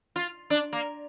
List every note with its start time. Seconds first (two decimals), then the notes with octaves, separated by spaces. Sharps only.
0.16 F4
0.50 D4
0.73 A#3